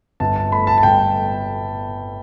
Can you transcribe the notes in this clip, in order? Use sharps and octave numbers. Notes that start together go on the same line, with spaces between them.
G1 A5
A5
A3 B5
A5
A5
G1 G5